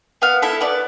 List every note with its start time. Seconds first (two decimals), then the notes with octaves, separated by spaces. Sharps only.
0.22 B3 F5
0.42 E4 A4 E5
0.61 B3 D5